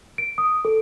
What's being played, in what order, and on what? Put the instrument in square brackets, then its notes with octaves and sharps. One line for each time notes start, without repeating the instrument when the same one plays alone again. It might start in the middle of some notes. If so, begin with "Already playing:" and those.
[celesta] D7
D#6
A4